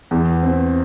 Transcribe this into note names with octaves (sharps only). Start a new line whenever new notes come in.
E2
C4